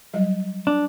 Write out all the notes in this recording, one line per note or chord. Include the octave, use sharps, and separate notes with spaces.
F#3 G3 D#5
D4